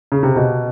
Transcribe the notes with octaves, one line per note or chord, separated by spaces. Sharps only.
C#3
C3
B2